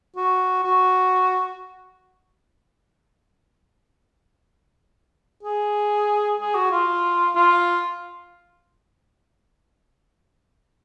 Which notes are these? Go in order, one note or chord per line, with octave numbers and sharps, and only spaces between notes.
F#4
F#4
G#4
G#4
F#4
F4
F4